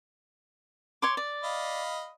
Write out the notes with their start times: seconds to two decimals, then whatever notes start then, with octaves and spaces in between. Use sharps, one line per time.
1.02 C#5 C6 D6
1.17 D5
1.44 D#5 F5 B5